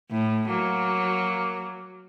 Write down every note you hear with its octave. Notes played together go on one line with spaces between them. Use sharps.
A2
F#3 A#3